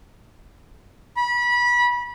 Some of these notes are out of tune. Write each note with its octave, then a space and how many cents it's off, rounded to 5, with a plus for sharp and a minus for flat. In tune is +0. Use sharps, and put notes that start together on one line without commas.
B5 -25